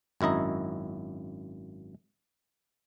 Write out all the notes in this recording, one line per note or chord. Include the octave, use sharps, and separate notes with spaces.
G#1 F#2 E4 D#5 A#5